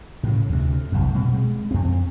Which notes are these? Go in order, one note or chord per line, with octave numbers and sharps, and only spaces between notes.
A2 C#3
D2 C3
F1 B1 F2
B2 G3 C4
G#3
F2 C4